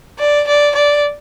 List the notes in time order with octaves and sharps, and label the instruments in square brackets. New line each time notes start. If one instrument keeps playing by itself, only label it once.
[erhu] D5
D5
D5